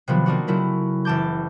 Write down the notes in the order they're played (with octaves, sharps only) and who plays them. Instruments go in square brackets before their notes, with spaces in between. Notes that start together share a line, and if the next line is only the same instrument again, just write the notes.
[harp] C3 D#3 F3 F#3 B3 D4
A#3 C4 D4 D#4 F#4
C#3 F#3 A3 E4 A#4
F#1 E3 A5 D6 G6